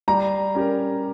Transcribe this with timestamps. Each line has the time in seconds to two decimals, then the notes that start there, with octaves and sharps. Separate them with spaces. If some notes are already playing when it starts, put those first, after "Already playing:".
0.08 G3 A#5
0.55 C#4 G4 A#4